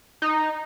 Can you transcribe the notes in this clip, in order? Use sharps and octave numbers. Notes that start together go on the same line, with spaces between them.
D#4